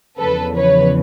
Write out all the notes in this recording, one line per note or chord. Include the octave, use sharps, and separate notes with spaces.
E2 C#3 F3 A4 B4
B4 C#5